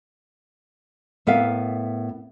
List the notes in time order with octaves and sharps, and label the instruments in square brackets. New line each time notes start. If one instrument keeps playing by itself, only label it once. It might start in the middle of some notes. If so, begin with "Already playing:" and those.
[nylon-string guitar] A2 B3 A#4 E5 F5